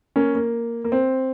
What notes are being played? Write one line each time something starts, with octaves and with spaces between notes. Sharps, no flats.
A#3 C#4
A#3
A#3
C4